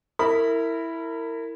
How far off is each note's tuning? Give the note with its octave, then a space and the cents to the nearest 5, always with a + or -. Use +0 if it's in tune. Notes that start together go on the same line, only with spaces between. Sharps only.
E4 +0 A#4 -30 B5 +0